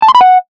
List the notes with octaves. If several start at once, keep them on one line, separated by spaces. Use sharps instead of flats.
A5
C6
B5
F#5